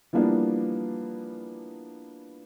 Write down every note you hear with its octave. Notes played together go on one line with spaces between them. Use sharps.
E3 F3 G3 A#3 B3 D4